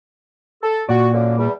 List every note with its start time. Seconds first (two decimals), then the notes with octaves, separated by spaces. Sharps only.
0.63 A4
0.89 A#2 F#4 D5
1.13 F#2 D3 A#3
1.38 E2 G3